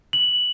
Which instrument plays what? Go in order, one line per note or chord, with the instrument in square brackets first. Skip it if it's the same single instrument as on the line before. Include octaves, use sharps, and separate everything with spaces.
[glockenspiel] F#7